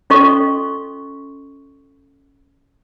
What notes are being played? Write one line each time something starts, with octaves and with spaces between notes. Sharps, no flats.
C#4 F4 A4 D#5 C6 C#6